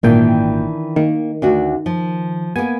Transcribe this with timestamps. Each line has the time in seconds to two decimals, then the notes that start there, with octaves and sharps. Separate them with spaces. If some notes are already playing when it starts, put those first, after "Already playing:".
0.03 G#1 A#2 D#3 E3 D4 G5
0.96 D#3 A#3
1.42 D2 D4 F#4
1.86 F3
2.56 A#3 B3 G#5